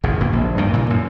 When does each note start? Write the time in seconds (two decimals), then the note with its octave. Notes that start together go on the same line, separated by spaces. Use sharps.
0.04 G#1 E2 C#3
0.20 F1 B2 A#3
0.33 A#1
0.57 D2 G2 D#3
0.73 A#2 C#3 E3
0.90 F#2